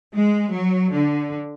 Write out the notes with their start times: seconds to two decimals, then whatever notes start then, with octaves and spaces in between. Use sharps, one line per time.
0.14 G#3
0.52 F#3
0.92 D3